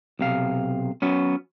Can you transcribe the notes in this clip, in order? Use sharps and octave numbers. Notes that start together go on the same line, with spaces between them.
B1 C3 F5
F#3 B3 C#4